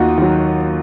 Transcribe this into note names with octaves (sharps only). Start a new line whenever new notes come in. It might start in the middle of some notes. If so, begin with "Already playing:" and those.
Already playing: D#2 D#4 F4 F#4
D#3 F#3